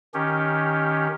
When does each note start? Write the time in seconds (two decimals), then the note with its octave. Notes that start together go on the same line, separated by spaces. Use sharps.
0.14 D#3 C#4 G4